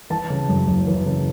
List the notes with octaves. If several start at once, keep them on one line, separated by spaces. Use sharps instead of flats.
E3 A5
C#3
F#2
F#1
E3
C#3